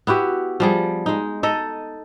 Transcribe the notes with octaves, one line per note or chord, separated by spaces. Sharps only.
B3 E4 F#4 G4
F3 G3 G#4
G#3 D#4
D#4 A4 D#5